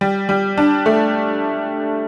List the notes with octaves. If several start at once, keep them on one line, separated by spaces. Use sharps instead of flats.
G3
G3
D4
A3